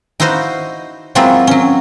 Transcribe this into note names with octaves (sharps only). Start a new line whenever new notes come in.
D#4 E4 F#4 C5 D#5 F5
F#3 G#3 A#3 C4 E4 F4
F#3 C#4